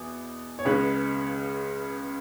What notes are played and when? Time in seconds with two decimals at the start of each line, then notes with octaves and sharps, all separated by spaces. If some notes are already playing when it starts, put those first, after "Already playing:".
Already playing: E2 B2
0.59 C#5
0.65 C#2 C#3 G#3 B4